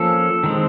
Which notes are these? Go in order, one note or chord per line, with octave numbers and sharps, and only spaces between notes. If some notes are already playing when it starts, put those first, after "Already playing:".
Already playing: F3 A#3 C#4 A4
D#3 G#3 C4